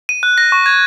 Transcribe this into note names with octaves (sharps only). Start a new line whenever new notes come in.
D#7
F#6
A#6
C#6
G#6